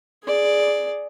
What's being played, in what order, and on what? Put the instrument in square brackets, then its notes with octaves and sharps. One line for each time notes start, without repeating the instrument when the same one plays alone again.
[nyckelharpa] G#4 D5